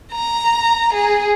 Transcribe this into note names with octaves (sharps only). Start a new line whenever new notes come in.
A#5
G#4